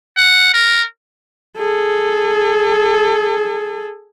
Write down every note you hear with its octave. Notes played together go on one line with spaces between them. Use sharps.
F#5
A#4
G#4 A4